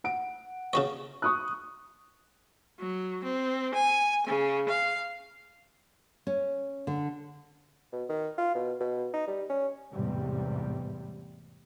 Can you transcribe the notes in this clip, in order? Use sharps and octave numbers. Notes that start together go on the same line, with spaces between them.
F#5 D7
C#3 F#4 C#5
C#6 D#6 F#6
F#3
C4
G#5
C#3
F5
C#4
D3
B2
D#3
F4
B2
B2
D#4
G3
C#4
A1 E2 G#2 C3 G3